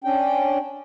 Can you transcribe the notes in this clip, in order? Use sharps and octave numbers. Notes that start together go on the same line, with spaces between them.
C#4 D4 G5